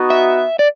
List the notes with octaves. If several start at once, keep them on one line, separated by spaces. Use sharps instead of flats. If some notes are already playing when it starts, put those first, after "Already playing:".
Already playing: B3 D#4 F#4
E5
D5